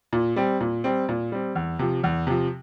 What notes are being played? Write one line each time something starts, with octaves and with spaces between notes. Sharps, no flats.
A#2
G3 C4
A#2
G3 C4
A#2
G3 C4
E2
C3 F3
E2
C3 F3